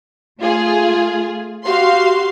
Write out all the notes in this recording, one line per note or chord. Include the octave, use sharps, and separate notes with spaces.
A3 F4 G#4
F#4 G4 F5 C6